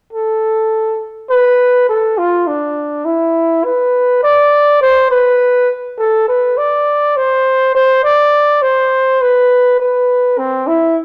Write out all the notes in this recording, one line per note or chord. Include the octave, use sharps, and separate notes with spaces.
A4
B4
A4
F4
D4
E4
B4
D5
C5
B4
A4
B4
D5
C5
C5
D5
C5
B4
B4
C4
E4